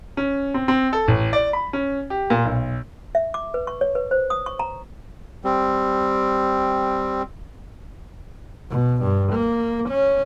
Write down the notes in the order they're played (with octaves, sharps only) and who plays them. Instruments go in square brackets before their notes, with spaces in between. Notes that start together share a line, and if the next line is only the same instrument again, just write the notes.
[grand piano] C#4
C4
C4
A4
A1
D5
B5
C#4
G4
A#2
B1
[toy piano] E5
D6
B4
C#6
C#5
B4
C5
D#6
C#6
A#5
[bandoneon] G3 C4
[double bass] B2
G2
A#3
C#4